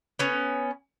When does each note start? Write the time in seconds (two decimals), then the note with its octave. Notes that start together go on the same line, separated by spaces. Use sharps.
0.19 B3 C#4